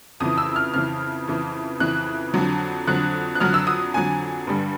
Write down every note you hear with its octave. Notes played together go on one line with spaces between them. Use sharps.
F2 C#3 E3 D#6
E6
F6
F2 C#3 E3 F6
F2 C#3 E3
F2 C#3 E3 F#6
F2 D3 F#3
F2 D3 F#3 F#6
F#6
F2 D3 F#3 F6
E6
D#6
F2 D3 F#3 G#5
G2 D3 G3